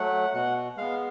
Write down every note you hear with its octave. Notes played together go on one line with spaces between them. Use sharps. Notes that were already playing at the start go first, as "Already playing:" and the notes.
Already playing: F#3 A3 F#5
B2 F#5
G#3 B3 F5